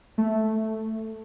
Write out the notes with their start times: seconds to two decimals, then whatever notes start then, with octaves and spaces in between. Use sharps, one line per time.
0.18 A3